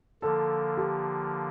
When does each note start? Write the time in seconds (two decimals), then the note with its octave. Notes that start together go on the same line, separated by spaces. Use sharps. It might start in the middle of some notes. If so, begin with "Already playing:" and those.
0.22 D3 F3 A#3 A4
0.77 G4